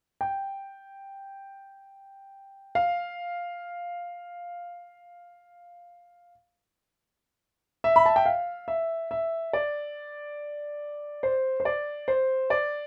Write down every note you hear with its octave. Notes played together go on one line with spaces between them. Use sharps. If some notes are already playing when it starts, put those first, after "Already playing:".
G5
F5
E5
B5
A5
G5
F5
E5
E5
D5
C5
C5
D5
C5
D5